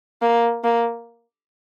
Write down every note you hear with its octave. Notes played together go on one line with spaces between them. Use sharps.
A#3
A#3